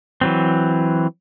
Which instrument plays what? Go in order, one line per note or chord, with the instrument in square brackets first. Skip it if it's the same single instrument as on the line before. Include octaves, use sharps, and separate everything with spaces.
[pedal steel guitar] E3 F#3 C4